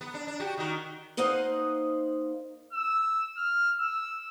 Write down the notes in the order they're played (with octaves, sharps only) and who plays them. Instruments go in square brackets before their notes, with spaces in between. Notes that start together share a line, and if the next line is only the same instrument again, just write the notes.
[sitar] B3
D4
D4
F#4 G4
D#3 F#4
[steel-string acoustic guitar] A#3 D#4 C5 D#5 F5 F#5
[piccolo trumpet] E6
F6
E6